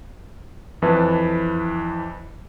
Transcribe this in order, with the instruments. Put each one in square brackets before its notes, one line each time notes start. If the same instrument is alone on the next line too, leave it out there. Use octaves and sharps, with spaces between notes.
[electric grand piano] F2 E3 E4 B4 A5